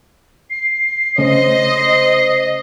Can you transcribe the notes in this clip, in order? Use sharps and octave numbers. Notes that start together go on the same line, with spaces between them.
C7
C#3 A3 C#4 C5 D#5
C7